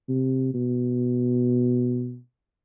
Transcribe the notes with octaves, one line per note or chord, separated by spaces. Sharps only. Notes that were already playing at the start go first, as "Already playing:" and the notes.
C3
B2